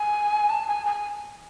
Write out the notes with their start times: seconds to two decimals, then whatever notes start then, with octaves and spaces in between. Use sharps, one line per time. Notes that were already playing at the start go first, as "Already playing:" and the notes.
Already playing: G#5
0.49 A5
0.67 G#5
0.86 G#5